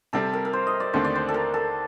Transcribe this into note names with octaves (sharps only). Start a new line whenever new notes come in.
C3 G3 C4 A4
A#4
A#4
C5
D#5
D5
D#2 D3 A3 C4 C5
D5
C5
A4
A#4
A4